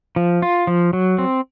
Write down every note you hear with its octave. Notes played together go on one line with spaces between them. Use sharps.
F3
F4
F3
F#3
C4